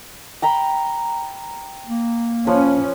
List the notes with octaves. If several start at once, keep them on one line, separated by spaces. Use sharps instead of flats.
G5 A#5 B5
A#3
F3 C#4 B4